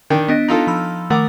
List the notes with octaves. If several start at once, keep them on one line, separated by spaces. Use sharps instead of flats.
D#3 D4 G5
B3 D4 D#5 A#6
D#4 F4 A4
F3 B5 E6
D#3 A3 A#4 F#5 D6